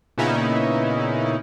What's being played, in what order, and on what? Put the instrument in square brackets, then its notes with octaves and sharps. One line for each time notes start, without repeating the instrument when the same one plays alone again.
[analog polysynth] A#2 C#3 B3 C#4 D#4 E4